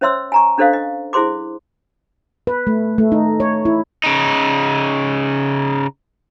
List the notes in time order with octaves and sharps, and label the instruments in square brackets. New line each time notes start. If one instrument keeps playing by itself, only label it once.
[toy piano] C#4 C5 C#5 E5 C6 E6
G#5 A#5 C#6
C#4 D4 A4 C5 D#5 F5
D#5
E4 G#4 C5 C6 D6
[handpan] B4
A3
A3
D#4
C#5
E4
[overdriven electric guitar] C#3 D#4